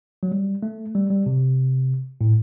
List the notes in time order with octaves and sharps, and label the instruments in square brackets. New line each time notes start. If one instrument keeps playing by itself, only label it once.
[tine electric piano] F#3
G3
A3
G3
G3
C3
A2